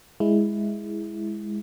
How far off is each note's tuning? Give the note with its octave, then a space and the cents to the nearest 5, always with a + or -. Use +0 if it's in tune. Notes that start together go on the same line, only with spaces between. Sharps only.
G#3 +0 E4 +0